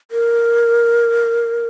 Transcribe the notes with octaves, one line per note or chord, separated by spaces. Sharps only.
A#4